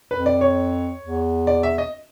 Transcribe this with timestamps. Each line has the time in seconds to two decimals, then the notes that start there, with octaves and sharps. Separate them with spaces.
0.11 F2 B4
0.26 D5
0.41 C#5
1.02 E2
1.47 D5
1.63 E5
1.78 D#5